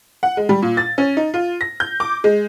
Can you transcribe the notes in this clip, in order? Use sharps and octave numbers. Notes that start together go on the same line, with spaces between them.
F#5
G#3
G3
A#2
A6
C#4
D#4
F4
A#6
G6
D6
G#3